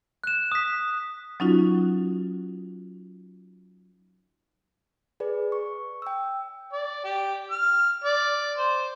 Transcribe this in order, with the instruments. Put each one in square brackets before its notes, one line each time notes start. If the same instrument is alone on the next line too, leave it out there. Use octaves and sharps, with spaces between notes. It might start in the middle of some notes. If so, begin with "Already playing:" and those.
[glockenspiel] F#6 E7
D#6 B6
[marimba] F#3 C#4 D#4 F4 F#4
[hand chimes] G#4 B4 D5
C#6
G5 E6
[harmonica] D5
G4
F6
D5
C5